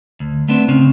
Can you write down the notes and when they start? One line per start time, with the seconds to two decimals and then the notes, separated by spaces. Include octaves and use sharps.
0.20 D2
0.48 A3 B3 C4 D4
0.69 C#3 C4 C#4